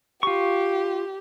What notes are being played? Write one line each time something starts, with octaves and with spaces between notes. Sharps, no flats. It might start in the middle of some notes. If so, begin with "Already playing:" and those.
F4 G4 C#6